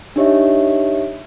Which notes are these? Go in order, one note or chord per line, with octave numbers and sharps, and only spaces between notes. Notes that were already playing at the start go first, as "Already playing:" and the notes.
D4 D#4 G4 C#5 D#5 E5